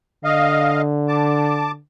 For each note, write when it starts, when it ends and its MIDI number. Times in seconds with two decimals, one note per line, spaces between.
0.24 1.79 50
0.24 0.82 75
0.24 0.82 77
1.08 1.71 81
1.08 1.71 86